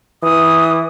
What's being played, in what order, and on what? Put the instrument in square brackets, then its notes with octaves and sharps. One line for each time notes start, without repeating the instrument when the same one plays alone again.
[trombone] E3 [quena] D#6